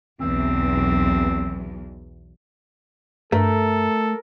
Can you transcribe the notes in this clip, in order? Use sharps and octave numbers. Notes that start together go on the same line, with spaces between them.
B1 E2 C4
G2 A3 A4 A#4